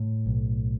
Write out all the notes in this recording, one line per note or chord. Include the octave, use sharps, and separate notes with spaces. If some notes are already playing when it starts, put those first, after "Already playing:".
Already playing: A2
B1